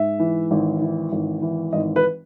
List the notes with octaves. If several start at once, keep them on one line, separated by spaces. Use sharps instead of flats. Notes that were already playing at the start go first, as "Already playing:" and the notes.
Already playing: G#2 E5
E3
G#1
E3
G#1
E3
G#1 D#5
B4